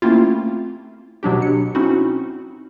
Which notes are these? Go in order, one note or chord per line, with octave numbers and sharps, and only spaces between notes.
A3 A#3 C4 C#4 E4 F4
B2 F#3 D4 G4
C#7
C4 C#4 D#4 E4 F#4